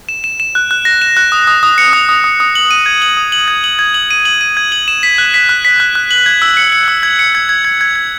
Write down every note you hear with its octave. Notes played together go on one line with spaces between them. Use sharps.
E7
E7
E7
F#6
F#6
A#6
E7
F#6
D#6
D#6
D#6
C#7
D#6
D#6
D#6
D#6
F#7
D#7
G#6
F#7
D#6
F#7
G#6
F#7
G#6
F#7
D#7
F#7
D#7
G#6
F#7
E7
B6
F#6
B6
F#6
B6
F#6
F#6
F#7
G#6
E6
C#7
C#7
E6
G#6
C#7
G#6
G#6
G#6
G#6
G#6